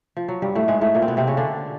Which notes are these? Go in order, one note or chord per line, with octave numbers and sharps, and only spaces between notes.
F3
F#3
G2 G3
A2 A3
G#2 G#3
A2 A3
A#2 A#3
C4
B2 B3
C3 C4
C#3 C#4
D3 D4